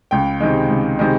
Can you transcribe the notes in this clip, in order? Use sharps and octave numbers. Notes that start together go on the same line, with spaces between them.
C#2 G5
C3 D#3 G#3
C#2
C3 D#3 G#3